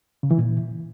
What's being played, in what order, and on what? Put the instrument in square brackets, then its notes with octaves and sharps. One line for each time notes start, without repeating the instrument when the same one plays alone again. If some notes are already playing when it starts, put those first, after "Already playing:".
[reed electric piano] C#3
E3
A#2